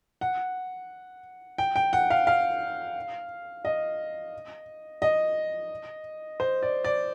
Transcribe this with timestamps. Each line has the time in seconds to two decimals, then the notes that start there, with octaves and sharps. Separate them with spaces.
0.21 F#5
1.58 G5
1.76 G5
1.93 F#5
2.10 F5
2.27 F5
3.65 D#5
5.02 D#5
6.40 C5
6.63 D5
6.84 D5